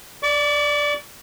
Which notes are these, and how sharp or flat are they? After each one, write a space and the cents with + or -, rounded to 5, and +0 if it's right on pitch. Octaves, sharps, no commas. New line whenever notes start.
D5 +0 D6 -45